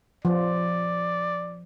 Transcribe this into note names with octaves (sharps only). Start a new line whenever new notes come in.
F3 D5